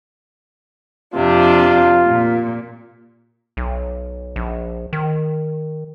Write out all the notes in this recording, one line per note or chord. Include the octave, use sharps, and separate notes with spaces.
F2 C3 D4 F4
A#2
B1
A#1
D#3